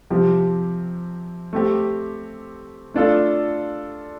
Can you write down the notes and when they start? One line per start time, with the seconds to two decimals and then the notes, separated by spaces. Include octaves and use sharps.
0.10 C3 F3 C4 G4
1.53 A3 C4 G4
2.94 A3 D4 F4 A4